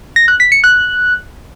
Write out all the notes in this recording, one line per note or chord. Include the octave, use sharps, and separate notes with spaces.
A#6
F#6
B6
C#7
F#6